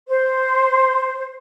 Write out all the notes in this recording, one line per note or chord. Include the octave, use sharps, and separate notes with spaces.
C5